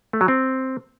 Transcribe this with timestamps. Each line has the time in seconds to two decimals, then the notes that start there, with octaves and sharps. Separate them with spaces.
0.13 A3
0.21 F#3
0.28 C4